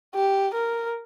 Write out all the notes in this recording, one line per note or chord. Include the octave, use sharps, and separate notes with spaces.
G4
A#4